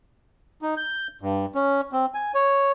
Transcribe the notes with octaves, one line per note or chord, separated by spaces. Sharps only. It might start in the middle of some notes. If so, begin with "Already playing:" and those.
D#4
G6
G2
C#4
C4
G#5
C#5